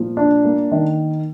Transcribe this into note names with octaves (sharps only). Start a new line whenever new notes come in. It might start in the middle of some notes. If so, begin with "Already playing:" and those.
Already playing: A#2 F3
D4
A#3
D#3